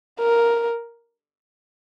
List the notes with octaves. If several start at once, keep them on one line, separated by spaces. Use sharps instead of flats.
A#4